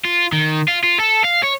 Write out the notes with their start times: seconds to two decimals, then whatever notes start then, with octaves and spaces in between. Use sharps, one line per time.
0.05 F4
0.33 D#3
0.68 F4
0.84 F4
1.00 A4
1.25 F5
1.44 C#5